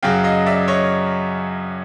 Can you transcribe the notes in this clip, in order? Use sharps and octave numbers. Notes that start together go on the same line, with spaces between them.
F#2 C#3 F#3 F5 G5
D#5 F5
D5 E5
C#5 D#5